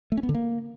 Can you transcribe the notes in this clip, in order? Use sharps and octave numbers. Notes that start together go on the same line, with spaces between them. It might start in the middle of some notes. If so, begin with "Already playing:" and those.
A3
C#4
B3
D3
A#3